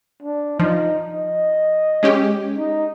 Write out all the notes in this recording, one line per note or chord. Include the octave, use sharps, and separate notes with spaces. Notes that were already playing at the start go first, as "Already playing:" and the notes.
D4
F3 D#4
D#5
G#3 C#4 G4
D#4